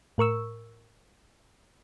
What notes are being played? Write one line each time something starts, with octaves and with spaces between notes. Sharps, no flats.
A2 A#4 C#6 E6